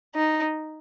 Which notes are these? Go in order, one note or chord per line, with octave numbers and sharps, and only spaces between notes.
D#4